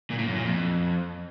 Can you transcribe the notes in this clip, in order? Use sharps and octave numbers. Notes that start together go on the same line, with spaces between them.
A#2
A2
F#2
A#2
F2